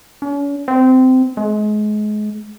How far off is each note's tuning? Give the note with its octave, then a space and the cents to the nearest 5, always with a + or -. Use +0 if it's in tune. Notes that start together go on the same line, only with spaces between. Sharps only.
C#4 +40
C4 -20
G#3 +30